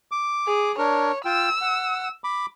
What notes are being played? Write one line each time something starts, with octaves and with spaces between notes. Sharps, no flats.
D6
G#4
D4 A#4 C#5
F4 G5 E6
F#5
B5 D6